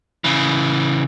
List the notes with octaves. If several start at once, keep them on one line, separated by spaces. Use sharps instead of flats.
C#3 E3